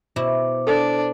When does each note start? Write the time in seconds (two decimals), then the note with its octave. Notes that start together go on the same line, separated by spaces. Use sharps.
0.16 B2 E4 C5 D6
0.67 D4 A4